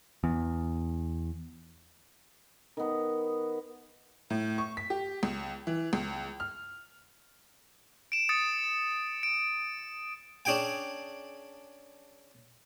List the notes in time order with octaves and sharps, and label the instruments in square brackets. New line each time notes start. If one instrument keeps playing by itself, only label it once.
[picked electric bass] E2
[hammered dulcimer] D#3 B3
[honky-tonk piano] A2
C#6
B6
G4
C#2
E3
C#2
F6
[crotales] D7 E7
D#6 A6 C#7
D7
[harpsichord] C#4 D4 G#4 G5 G#5